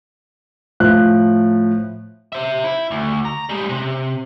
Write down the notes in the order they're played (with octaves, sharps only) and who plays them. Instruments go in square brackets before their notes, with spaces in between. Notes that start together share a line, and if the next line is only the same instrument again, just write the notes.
[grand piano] A2 F3 F#6
[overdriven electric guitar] C5 E5
E4
D2
A#5
G3 G#3
C3